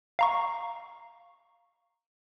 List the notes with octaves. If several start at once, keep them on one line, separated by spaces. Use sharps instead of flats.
F5 A#5 C#6